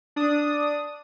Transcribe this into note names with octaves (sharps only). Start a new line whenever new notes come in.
D4 D#6